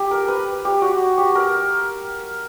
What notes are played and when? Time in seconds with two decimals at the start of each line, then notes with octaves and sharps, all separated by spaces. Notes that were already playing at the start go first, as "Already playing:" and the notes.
Already playing: G4
0.11 A#4
0.28 B4
0.65 G4
0.82 F#4
1.18 G4
1.35 A#4